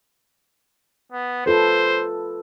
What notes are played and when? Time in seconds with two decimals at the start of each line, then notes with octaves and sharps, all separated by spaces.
1.12 B3
1.46 F4 A4 B4 C5